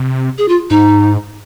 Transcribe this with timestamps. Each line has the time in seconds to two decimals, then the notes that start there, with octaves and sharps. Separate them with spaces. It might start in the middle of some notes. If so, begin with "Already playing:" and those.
Already playing: C3
0.38 G#4
0.48 F4
0.70 G#2 D#4